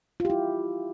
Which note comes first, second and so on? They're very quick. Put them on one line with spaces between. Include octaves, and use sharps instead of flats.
F4 G4 E4